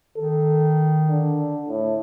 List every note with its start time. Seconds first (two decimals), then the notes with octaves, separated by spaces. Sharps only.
0.17 D#3 A4
1.10 D3
1.68 A2